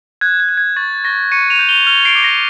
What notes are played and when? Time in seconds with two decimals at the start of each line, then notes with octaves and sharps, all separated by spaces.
0.21 F#6 G#6
0.40 G#6
0.49 F#6
0.57 G#6
0.76 C#6 A6
1.04 C#6 A#6
1.32 C#6 C#7 D#7
1.50 D#7 F7
1.59 G6
1.69 F7 G7
1.87 F6 F7 G7
2.05 C7 D7
2.16 D6
2.24 A#6